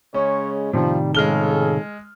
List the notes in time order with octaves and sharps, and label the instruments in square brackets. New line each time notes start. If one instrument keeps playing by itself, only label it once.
[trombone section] C#3 G#3 [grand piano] C#4 [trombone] C#5
[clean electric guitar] A2 C3 D#3 [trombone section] F3 [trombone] G3
[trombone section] F2 G#4 A4 [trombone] C#3 [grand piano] G#3 F6 G7